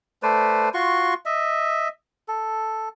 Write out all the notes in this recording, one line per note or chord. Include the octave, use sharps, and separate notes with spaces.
A3 B4 C5 D5
F4 F#4 C6 C#6
D#5 E5
A4